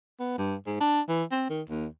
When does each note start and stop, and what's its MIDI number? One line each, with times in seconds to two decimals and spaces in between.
0.20 0.37 59
0.38 0.55 43
0.66 0.79 44
0.80 1.01 62
1.08 1.23 52
1.31 1.49 60
1.50 1.62 51
1.69 1.87 39